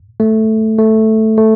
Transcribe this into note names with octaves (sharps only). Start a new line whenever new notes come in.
A3
A3
A3